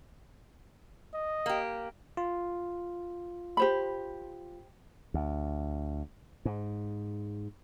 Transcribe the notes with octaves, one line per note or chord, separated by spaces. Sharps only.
D#5
A#3 G4
F4
G4 C5 B5
D2
G#2